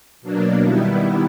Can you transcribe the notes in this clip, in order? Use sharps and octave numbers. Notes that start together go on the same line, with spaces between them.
B2 F#3 A#3 D4
D#3 G3 B3 E4